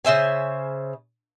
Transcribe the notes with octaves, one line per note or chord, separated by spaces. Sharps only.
C#3 C5 E5 G#5